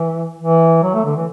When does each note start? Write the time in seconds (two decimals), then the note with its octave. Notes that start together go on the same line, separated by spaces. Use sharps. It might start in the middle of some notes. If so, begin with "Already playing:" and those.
Already playing: E3
0.39 E3
0.83 F#3
0.94 A3
1.05 D3
1.16 E3